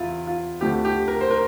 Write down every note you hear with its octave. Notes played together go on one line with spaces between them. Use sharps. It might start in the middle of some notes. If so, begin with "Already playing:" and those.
Already playing: E2 C3 E3 E4 F4
F4
D2 D3 F3 A3 G4
G4
A#4
C5
A#4